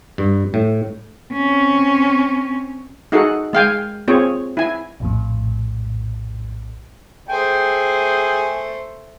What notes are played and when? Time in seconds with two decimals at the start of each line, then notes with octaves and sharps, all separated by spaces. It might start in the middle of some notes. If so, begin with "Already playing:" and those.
0.18 G2
0.54 A2
1.32 C4 C#4
3.12 D#4 F#4 G#4 A4 F#5
3.53 G#3 F5 G5 G#5
4.08 C4 F4 G#4 C#5
4.57 E4 G#5
5.00 A#1 F2 A2
7.29 A3 G#4 C5 G5 G#5